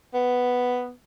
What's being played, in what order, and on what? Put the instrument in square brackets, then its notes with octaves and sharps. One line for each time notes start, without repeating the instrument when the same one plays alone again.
[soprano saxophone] B3